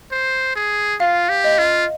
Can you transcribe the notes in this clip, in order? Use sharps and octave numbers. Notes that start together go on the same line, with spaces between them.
C5
G#4
F4 F5
G4
D#5
F4